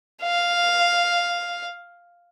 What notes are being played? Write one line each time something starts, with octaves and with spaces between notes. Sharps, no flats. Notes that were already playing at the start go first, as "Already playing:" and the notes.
F5